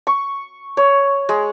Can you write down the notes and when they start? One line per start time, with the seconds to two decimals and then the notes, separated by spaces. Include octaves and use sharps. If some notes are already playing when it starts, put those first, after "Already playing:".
0.07 C#6
0.77 C#5
1.29 G#3